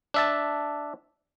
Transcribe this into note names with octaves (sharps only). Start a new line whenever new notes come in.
D4 E5 A5